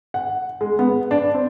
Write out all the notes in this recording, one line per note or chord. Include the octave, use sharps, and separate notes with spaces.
F#5
G#3
B3
D4
C4